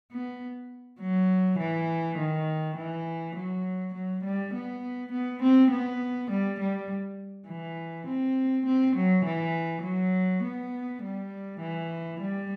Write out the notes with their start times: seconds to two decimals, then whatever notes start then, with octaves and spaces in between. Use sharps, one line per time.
0.12 B3
1.00 F#3
1.59 E3
2.19 D#3
2.77 E3
3.36 F#3
3.94 F#3
4.24 G3
4.54 B3
5.12 B3
5.42 C4
5.71 B3
6.30 G3
6.60 G3
7.48 E3
8.08 C4
8.66 C4
8.96 F#3
9.25 E3
9.83 F#3
10.44 B3
11.02 G3
11.60 E3
12.20 G3